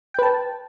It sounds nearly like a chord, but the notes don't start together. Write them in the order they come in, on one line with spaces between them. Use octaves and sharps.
G5 B4 A5